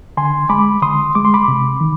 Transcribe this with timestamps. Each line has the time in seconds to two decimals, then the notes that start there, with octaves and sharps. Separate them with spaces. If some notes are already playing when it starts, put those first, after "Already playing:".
0.17 D3 G#5 C6
0.49 G#3 B5 D6
0.82 D3 C6 D#6
1.15 G#3 D6
1.25 C6
1.34 B5 D6
1.48 C3
1.81 D#3